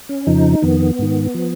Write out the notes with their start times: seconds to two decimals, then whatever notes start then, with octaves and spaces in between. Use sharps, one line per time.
0.09 C#4
0.27 F2 C#3 F3 D#4
0.62 F2 D#3 B3
0.99 G#2 D#3
1.34 F3